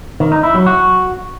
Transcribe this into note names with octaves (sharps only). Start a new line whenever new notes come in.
D#3
D#4
E4
F#3
F#4